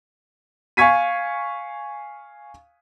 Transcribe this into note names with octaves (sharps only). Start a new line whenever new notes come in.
F5 G#5 C#6 G#6 B6 D#7